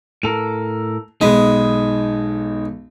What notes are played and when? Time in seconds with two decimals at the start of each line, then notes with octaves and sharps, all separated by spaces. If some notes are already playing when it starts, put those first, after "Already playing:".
0.23 A2 A4 A#4 F7
1.21 B1 G#3 D#4 B4